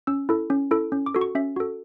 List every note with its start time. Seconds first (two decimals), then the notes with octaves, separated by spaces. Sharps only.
0.07 C#4 E6
0.29 E4 A4
0.50 C#4
0.71 E4 A4
0.92 C#4
1.06 D6
1.15 F#4 A4
1.21 C#6
1.35 C#4 E5
1.56 F#4 A4